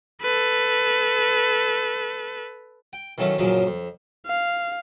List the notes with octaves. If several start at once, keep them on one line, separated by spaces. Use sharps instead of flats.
A4 B4
G5
D#3 E3 F#3 A3 C#4
F#2 A#2 C#3 F3 F#3
F2
F5